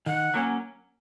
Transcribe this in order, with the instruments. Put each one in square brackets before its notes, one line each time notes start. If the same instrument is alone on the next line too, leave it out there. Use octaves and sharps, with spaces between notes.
[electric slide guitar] D#3 [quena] F#5
[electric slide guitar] F#3 A#3 C#4